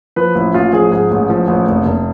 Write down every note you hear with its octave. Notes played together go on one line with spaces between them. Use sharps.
F3 B4
A1 E4
A1 F4
F3 G#4
G#2 G#4
A1
F3
A1
F1
F1